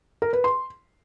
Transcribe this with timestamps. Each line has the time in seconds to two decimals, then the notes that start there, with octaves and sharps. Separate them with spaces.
0.22 A#4
0.33 B4
0.44 C6